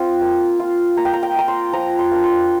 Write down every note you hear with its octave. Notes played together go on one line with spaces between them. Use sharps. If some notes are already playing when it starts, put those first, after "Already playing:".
Already playing: C4 F4 G5
A#3
F4
A#3 A#5
G5
A#5
G5
F4 A#5
C6
F3 A#5
C6
A#3 D4
C6